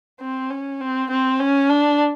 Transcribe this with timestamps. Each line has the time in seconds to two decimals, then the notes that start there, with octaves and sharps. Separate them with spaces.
0.21 C4
0.50 C#4
0.81 C4
1.10 C4
1.40 C#4
1.69 D4